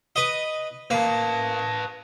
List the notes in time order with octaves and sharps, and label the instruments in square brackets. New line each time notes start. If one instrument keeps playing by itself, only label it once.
[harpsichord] B4 D#5
[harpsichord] A#3 [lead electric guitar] B4 A5